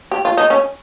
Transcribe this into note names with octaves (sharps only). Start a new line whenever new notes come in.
G4
F4
D#4
C#4